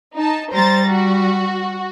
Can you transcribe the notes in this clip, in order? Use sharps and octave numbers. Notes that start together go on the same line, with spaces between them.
D#4 A5
G3 C5 A#5 A6
F#4